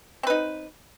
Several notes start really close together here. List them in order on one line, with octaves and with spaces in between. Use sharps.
C4 B4 D#4